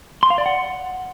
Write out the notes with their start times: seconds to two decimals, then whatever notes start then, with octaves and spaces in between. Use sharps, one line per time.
0.23 C6
0.30 F5
0.38 D5
0.46 F#5